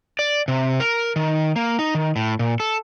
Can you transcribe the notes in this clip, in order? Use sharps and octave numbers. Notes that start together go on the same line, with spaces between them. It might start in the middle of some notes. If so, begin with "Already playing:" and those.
D5
C3
A#4
D#3
A#3
D#4
D#3
A2
A#2
A4